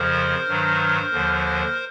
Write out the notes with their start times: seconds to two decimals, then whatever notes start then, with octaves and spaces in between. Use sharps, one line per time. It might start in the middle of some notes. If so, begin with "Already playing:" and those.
Already playing: F2 C#3 F3 A#4 C5
0.48 G2 D#3 F#3
1.12 D#2 D3 F3